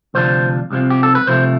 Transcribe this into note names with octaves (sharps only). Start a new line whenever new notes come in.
D2 C3 F3 D4 C5
C2 C3 F3
G4
A4
B4
C2 C3 F3 A3 C5